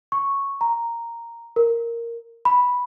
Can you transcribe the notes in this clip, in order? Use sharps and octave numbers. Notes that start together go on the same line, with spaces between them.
C#6
A#5
A#4
B5